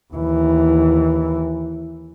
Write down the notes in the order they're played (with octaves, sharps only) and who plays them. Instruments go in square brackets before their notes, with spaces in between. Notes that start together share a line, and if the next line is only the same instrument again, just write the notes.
[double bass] D#2 E3